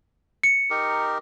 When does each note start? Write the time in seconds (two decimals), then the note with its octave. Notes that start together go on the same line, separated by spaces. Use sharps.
0.43 C#7
0.70 D#4 G4 A#4